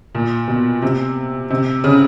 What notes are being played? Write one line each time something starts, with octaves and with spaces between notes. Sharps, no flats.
A#2
B2
C3
C3
C#3